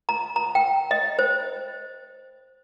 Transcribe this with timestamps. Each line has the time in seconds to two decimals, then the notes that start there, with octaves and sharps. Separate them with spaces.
0.09 A#5
0.36 A#5
0.55 G5
0.91 D#5
1.19 C5